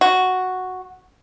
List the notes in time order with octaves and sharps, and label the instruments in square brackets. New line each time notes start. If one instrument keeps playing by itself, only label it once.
[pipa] F#4